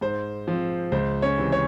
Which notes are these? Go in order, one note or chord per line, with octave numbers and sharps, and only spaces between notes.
G#2 C5
F3 C4
C#2 C5
C#4 C#5
C3 E3
C#5